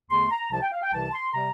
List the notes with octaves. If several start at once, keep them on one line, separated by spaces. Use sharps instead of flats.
E2 D3 A3 C6
A#5
C2 C3 F3 A5
G5
F5
G5
C2 C3 E3 A5
C6
C3 G3 A#5